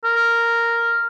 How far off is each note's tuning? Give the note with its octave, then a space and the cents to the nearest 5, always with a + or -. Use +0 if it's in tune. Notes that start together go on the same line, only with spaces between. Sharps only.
A#4 -5